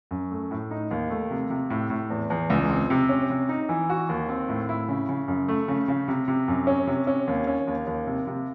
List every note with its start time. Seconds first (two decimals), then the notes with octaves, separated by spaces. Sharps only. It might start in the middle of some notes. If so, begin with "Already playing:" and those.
0.11 F#2
0.31 A3
0.51 A2
0.71 D#4
0.91 D#2
1.10 A3
1.31 C3
1.50 C3
1.70 A2
1.90 A2
2.10 E2
2.30 E2
2.50 C#2
2.70 C4
2.90 C3
3.09 C#4
3.30 C3
3.49 D#4
3.69 E3
3.89 F#4
4.09 D#2
4.29 C4
4.49 A2
4.69 E4
4.88 C#3
5.09 C#3
5.28 F#2
5.48 A3
5.68 C#3
5.88 C#3
6.08 C3
6.28 C3
6.48 F#2
6.67 C#4
6.87 C3
7.07 C#4
7.27 D#2
7.47 C#4
7.67 D#2
7.87 D#2
8.07 C3
8.27 C3